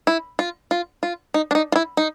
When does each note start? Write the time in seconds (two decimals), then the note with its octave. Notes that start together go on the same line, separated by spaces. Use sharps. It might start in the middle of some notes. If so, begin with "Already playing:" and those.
0.07 E4
0.39 F4
0.71 F4
1.03 F4
1.34 D#4
1.51 D4
1.55 D#4
1.72 F4
1.76 E4
1.97 D#4